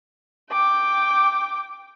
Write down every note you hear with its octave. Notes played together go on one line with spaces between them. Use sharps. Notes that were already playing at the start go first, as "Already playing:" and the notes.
G5 D6